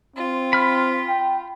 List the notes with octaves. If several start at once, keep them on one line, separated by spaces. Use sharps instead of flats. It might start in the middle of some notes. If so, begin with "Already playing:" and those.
C4 F4
B5 F6
G5